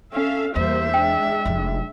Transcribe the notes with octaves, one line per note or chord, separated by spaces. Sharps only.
C#4 A4 E5 F5
E2 G3 A#3 C5 E5
G#3 D4 G5
F1 F3